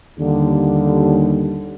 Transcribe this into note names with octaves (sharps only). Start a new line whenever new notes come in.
D#2 D3 G3